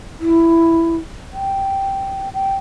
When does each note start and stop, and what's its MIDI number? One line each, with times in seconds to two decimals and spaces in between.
0.20 0.95 64
1.33 2.29 79
2.34 2.56 79